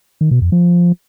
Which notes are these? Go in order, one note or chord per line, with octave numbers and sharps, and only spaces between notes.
D#3
B2
F2
F3